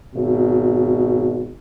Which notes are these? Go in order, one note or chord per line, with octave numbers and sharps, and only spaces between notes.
G#1 B2